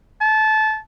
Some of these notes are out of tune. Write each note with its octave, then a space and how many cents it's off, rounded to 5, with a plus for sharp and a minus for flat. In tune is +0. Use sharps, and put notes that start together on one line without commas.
A5 -20